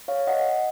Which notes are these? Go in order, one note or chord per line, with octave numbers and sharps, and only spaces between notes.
C#5 F5
D#5 F#5